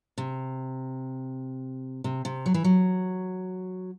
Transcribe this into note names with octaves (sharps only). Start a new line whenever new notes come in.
C3
C3
C3
F#3
E3
F#3